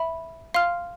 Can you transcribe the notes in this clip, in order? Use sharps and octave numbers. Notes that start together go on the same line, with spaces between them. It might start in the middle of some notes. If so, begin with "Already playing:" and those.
Already playing: E5 B5
F5 C6 F6